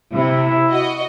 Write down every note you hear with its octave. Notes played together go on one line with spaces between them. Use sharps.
C3 E4
F#4 D#5